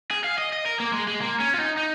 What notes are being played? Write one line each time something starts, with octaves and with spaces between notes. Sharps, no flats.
G#4
F5
D#5
D#5
A#4
A#3
G#3
G#3
A#3
C#4
F4
D#4
D#4